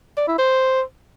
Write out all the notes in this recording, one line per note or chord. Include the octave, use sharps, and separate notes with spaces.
D5
E4
C5